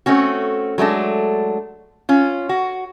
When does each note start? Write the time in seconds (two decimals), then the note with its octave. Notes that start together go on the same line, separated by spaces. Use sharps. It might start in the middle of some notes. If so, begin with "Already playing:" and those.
0.06 A3 C4 C#4 F#4
0.78 F#3 G#3 A3 D4
2.09 C#4 F4
2.49 F#4